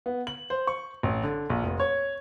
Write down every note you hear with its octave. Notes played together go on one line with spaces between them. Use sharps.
B3
F#7
C5
C#6
A1
D3
A#1
F1
C#5